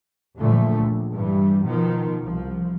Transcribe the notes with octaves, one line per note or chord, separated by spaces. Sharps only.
F#1 A#2 D3 F3 A3
C#2
G2 E3 G3
B2 D#3 F3
C2 F3